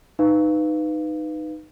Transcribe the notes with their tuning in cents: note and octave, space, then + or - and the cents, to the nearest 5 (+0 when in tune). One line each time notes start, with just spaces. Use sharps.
D#4 -10 B4 +10 F5 -10